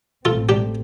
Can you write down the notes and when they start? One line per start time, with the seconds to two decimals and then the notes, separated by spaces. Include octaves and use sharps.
0.25 A1 A2 A3 C4 F4 A4
0.49 D4 G4